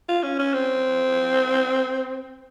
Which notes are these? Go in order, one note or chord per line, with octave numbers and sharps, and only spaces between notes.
F4
C#4
C#4
C4